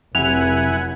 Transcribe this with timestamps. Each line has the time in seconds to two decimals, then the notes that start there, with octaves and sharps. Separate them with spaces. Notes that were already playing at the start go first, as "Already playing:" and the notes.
0.15 F1 F2 C3 F#3 E4 F#5 G#5 F7